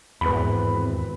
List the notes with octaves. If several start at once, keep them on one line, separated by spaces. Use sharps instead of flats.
G#1 E2 A2 C4 B4 B5